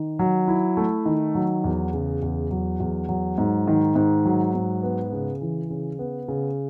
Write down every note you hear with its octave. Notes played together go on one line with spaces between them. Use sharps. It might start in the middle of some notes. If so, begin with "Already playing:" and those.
Already playing: D#3
F#3
E4
A3
D#3
F#3
E2
C#3
E2
F#3
E2
F#3
G#2
D#3
G#2
F#3
G#2
B3
C#3
E3
C#3
B3
C#3